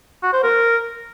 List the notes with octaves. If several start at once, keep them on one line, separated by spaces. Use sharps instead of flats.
F#4
C5
A#4